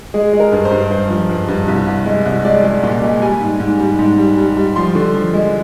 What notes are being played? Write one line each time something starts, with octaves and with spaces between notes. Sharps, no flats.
G#3 G#4
G#3
A#4
G2
C5
G2
G2 C5
F3
G2
G2
C2
C2
G#3
C2
G#3 D5
G#3
A#2
G#3
G3 G#5
G#2
G#2
G3
G#2
G3
G3
G3
F3 C6
D3
F3
G#3